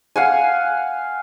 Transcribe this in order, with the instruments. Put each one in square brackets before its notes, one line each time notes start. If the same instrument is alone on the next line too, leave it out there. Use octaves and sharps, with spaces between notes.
[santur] F5 F#5 G#5